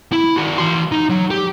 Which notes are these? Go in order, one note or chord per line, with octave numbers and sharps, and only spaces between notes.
E4
D#3 F#4
E3 C6
D#4
F#3
G4